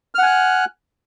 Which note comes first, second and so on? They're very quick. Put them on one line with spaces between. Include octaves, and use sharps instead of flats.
F6 F#5 G#5 F#6